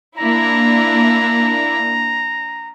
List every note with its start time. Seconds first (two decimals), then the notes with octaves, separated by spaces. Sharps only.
0.18 A#3 D4 E4 A#5